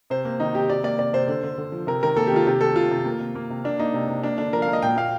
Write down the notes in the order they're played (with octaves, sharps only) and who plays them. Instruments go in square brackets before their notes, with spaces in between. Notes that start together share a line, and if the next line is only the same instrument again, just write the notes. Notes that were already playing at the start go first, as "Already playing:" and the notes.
[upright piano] C3 C5
A#3
D#3 D#4
C3 G4
C3 D5
A#3 D5
C3 D5
C3 C5
D3
D3
D3
F3
C3 A#4
D#3 A#4
A#3 A4
G4
D#3 F4
C3 G4
A3 A4
C3 F4
C3
A#3
C3
A#3
C3
A#3 D4
A#3 D#4
C3
C3
A#3 D4
D3 D4
F3 A#4
F5
A#3
D#5
A#2 G5
A#3 F5